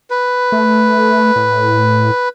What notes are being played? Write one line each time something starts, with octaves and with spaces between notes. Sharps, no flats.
B4
A3
A2